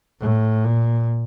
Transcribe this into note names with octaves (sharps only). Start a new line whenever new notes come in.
A2
A#2